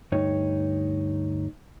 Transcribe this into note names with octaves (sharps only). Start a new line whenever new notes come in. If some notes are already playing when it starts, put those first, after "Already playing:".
D2 G2 D#4 C#5